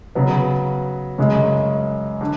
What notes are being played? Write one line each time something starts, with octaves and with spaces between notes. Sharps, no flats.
C#3 F#3 B3
F#2 C#3 G#3
D3